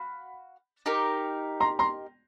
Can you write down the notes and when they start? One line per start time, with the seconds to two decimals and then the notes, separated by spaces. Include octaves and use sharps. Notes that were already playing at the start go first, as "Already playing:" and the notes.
Already playing: F#4 F5 B5
0.86 D#4 G4 A#4
1.60 A#5 C6
1.79 A#5 C6